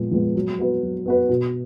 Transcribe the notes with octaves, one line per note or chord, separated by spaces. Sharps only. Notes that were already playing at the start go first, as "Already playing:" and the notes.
Already playing: A#2 F3 G#3 B3
F3 G#3 B3
F#3
B3 F#4 B4
F#3
B3 F#4 B4
B2